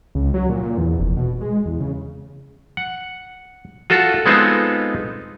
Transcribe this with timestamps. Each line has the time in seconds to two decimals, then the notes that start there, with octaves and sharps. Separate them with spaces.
0.15 C#2
0.34 F#3
0.50 A#2
0.63 A#2
0.78 E2
0.99 F1
1.17 B2
1.41 G#3
1.66 E2
1.80 C#3
2.77 F#5
3.90 F4 F#4 A4
4.26 G#3 B3 C4 D#4 F4 A4